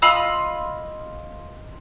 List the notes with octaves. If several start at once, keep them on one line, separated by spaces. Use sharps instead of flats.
F4 D#5 B5 E6